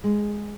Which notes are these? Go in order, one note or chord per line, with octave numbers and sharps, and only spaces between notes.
G#3